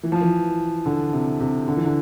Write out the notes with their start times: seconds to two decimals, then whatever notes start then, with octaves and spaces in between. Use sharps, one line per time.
0.03 E3
0.12 F3
0.22 E3
0.86 D3
1.13 C3
1.40 C3
1.68 D3
1.77 E3
1.85 D3